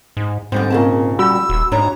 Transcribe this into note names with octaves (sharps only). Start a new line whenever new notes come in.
G#2
G#2 D3 G3 C4
A#2 C#3 C4 G#4 A#4 A5
G3 F#4 B5 E6
D#1
G#2 D4 C#5 A#5